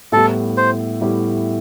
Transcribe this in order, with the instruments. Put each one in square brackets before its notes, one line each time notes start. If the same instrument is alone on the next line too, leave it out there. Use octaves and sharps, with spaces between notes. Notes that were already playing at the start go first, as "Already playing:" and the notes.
[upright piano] A2 G3 B3 E4 G4 [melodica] A4
[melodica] C5
[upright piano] A2 G3 B3 E4 G4